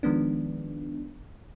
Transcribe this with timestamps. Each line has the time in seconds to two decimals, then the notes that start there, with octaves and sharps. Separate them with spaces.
0.03 D#3 F3 G#3 B3 D4